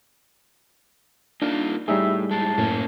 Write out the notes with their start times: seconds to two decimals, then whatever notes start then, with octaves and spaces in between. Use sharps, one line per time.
1.42 A#3 D4 D#4 F4
1.88 A2 G3 D#4 G#4 E5
2.31 A2 G#3 A5
2.58 F#2 A2 A#3 C#4